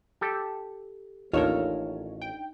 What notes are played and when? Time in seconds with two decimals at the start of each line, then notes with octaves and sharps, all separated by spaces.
0.21 G4 A4
1.33 A1 D#2 D4 D#4 F4 A4 A#4 C#5
2.22 G5